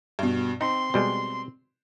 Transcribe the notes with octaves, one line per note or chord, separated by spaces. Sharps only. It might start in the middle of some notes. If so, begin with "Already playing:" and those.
G2 B2
C4 D#4 C6
B2 G3 G#3